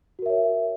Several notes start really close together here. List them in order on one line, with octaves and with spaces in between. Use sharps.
F#4 A#4 E5 C#5